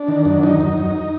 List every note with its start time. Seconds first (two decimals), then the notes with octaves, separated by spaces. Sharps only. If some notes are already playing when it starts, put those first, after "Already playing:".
Already playing: D4
0.08 D#3
0.25 F#2
0.43 D#3 D#4
0.61 F#2
0.78 F#2